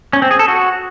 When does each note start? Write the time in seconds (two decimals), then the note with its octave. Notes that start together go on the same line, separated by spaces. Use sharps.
0.13 C#4
0.22 C4
0.31 G#4
0.39 A4
0.48 F#4